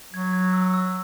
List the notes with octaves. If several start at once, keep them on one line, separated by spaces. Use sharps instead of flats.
F#3 G#6
G#6
E6
E6